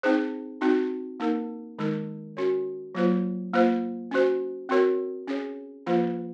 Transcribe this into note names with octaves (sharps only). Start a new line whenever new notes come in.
C4 D#4 G#4 C5
C4 D#4 F#4
A#3 D#4 A#4
D#3 G#3 D#4 A#4
C#4 F#4 A#4 C#5
F#3 A#3 F4 C5
A#3 F4 C5
C#4 F#4 C5
C4 F#4 A#4 C#5
C#4 G#4 C#5
F3 A#3 F4 C5